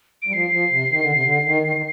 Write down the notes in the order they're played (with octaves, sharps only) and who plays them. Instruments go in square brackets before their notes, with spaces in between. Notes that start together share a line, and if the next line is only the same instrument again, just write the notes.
[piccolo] D7
[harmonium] G3
[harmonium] F3 [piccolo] C7
[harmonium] F3
C3
D#3
D3
C3
D3
D#3
D#3
D#3